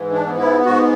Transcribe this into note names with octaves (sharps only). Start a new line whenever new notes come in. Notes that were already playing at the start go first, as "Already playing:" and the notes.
Already playing: G#2 E3
D4
B3
E4
G#2 F#4